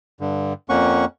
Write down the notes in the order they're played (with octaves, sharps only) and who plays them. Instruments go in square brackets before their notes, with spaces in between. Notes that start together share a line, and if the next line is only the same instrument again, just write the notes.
[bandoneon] G2 D3
F2 A#3 C#4 F#5 C#6